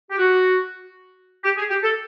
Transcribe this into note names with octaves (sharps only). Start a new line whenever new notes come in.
G4
F#4
G4
G#4
G4
A4